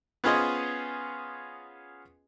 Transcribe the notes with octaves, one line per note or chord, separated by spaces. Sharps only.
B3 C#4 F4 G#4 C5 D#5